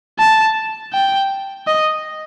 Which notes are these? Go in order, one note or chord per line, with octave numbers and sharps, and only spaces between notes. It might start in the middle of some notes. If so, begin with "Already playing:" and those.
A5
G5
D#5